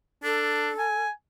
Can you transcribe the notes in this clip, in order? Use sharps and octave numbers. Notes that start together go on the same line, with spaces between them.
D4 A4
G#5